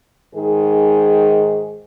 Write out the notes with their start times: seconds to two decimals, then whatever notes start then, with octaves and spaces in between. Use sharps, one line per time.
0.35 G#2 D#3 G#4